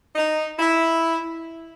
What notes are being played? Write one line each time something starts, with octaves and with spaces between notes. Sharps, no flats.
D#4
E4